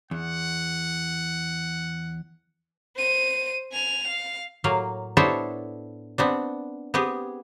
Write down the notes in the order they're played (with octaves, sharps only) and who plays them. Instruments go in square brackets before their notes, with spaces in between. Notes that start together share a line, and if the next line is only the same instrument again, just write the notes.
[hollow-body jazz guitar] E2 [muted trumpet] F#5
[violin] C5 D#7
G#5 F7
F5
[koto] A2 F#3 A#3 F5
B3 D4 E4 A4 C5 C#5
B3 C4 D4
B3 C4 G4 G#4